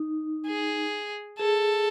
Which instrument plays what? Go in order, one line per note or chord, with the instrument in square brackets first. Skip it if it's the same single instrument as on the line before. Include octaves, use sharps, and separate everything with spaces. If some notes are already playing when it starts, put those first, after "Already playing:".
Already playing: [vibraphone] D#4
[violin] G#4
[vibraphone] G#4 [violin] A4